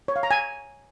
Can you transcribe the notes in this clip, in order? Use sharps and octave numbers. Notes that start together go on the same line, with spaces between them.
C#5
F5
A#5
G#5